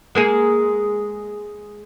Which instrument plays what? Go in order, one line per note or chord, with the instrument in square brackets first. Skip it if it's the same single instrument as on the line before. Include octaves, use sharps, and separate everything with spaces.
[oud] G#3 A#3 G#4